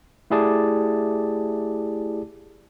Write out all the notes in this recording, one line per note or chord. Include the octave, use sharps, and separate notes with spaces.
A3 E4 G4 G#4 D5 A5